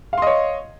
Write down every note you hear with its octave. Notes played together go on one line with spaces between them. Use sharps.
C#5 D#5 F5 C6